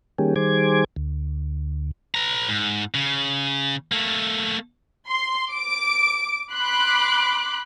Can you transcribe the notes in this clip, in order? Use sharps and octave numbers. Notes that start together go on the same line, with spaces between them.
D#3 G3 A#3 C#4 G4 G#4
D#3 G3 G#4 C5 D6 G#6
D2
B4 A#5
G#2
C#3
A3 A#3
C6
D6 D7
B5 C6 D6 F#6